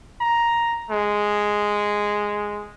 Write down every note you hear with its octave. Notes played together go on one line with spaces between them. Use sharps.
A#5
G#3